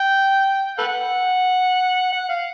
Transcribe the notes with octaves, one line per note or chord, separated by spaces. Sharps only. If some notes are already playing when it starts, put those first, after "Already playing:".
Already playing: G5
A4 B4 F#5
F#5
F5